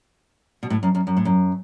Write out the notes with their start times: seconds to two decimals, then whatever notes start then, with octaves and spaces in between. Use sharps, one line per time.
0.63 B2
0.70 A2
0.83 F#2
0.95 F#2
1.07 F#2
1.17 A2
1.25 F#2